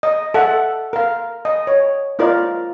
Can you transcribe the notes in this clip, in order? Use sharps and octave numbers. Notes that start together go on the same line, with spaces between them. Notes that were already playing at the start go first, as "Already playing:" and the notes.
D#5
A4 E5 F#5
A#4 F5
D#5
C#5
D#4 F4 A#4 C5 D5